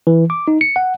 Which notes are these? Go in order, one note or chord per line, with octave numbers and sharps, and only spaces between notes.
E3
D6
D#4
C#7
F#5